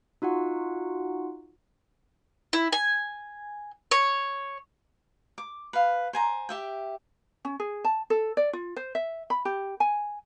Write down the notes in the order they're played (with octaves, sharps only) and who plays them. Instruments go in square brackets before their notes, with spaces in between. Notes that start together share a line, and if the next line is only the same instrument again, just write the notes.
[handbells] D#4 F4 F#4 F#5
[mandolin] E4
G#5
C#5
[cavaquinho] D6
B4 F5
C5 G#5 A#5
G4 E5 G5
[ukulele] C#4
G#4
A5
A4
D5
F4
C5
E5
B5
G4
G#5